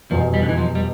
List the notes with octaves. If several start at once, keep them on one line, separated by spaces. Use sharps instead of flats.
F1 E2 B2 F3
G3
D3
E3
F3
G3